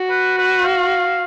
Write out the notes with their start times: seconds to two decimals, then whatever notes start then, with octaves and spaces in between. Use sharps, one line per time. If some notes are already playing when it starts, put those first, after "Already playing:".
Already playing: F#4
0.10 B4
0.38 B4
0.65 F5